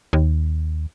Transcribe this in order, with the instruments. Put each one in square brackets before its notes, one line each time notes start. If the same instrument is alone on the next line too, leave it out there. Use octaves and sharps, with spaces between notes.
[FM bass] D#2